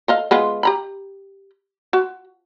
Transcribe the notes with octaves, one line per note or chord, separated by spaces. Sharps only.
A4 D#5 F5
G#3 B3 F4
G4 A#5 B5
F#4